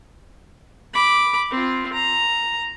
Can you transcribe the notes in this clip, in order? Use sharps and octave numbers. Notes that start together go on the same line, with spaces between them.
B5 D6
C4 F4
A#5